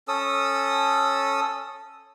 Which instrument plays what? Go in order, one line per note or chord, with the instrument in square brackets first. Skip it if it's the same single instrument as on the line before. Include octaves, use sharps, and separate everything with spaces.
[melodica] C#4 A4 D#6 E6